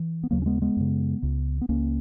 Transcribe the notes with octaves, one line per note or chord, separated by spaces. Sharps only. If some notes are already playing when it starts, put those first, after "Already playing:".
Already playing: E3
B3
D#2 C#3 F#3 A#3
C#4
G#3 B3
G#3 B3
F#2 C#3
C#2 C#3
B3
C#2 C#3 A#3 C#4